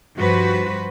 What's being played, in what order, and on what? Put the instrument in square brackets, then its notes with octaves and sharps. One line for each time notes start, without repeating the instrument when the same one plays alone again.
[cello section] G2 F3 F#4 B4 C5